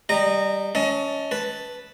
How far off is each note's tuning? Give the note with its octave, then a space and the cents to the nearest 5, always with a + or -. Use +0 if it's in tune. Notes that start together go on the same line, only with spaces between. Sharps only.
G3 +0 D#5 -20 A#5 -15
C#4 +15 D#5 +30 A5 +5
B4 -5 A5 +0